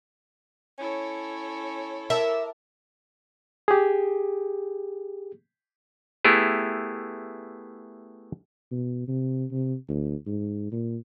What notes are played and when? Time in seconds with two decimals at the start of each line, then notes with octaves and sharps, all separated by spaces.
0.79 C#4 E4 A4 C#5
2.10 A#4 E5 A5 D6
3.68 G4 G#4
6.25 A3 B3 E4 G4 G#4
8.72 B2
9.08 C3
9.51 C3
9.89 D2
10.27 G#2
10.72 A#2